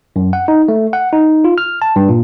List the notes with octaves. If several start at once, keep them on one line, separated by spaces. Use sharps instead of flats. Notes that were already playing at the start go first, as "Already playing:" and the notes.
F#2
F#5
D#4
A3
F#5
D#4
F4
F6
A5
G2
A#2